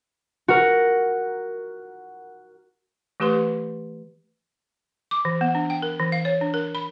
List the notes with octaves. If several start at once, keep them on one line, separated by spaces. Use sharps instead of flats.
F#4 A#4
E3 A3 G4 B4 C6
D6
E3
B3
D4
G5
A#4
E3
F5
C#5
D4
A#4
B5